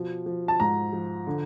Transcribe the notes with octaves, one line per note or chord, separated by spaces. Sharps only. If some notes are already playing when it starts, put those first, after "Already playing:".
Already playing: B2 F3
F3
A5
G#2 A#5
F3
D3